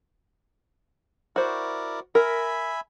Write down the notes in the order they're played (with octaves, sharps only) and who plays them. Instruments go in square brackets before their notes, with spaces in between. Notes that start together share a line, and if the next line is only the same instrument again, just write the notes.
[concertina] E4 A#4 D5 [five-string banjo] F#4 C5
[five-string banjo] A#4 [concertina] E5 G#5 B5